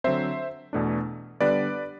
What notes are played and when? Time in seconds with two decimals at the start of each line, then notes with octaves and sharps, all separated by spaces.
0.04 D3 F#3 C4 C5 E5
0.73 E2 B2 A3 D4
1.40 D3 G3 B3 D4 B4 D5